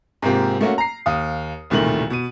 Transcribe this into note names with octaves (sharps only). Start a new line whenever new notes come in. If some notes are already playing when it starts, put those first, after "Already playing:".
G#2 C3 A#3 C4 F4 G4
A3 A#3 C#4 F#4
A#5 C7
D#2 F5 D#6
E1 C2 A#2 D#3 A3 F#7
B2 D#7